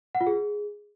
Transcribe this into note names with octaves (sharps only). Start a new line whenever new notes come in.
F#5
F4
G#4